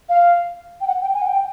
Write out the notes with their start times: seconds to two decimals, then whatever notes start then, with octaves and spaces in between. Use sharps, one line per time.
0.09 F5
0.81 G5
0.87 F#5
1.01 G5
1.14 G#5
1.22 F#5
1.26 G5